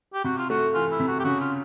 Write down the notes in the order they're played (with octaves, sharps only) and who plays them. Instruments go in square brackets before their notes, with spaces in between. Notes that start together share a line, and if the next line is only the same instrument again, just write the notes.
[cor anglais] G4
[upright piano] C3 [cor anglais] F#4
[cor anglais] F4
[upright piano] A3 [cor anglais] F#4
[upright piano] E3 [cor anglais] F4
[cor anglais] E4
[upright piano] C3
[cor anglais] F#4
G4
[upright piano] C#3 [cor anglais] F#4
[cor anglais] F4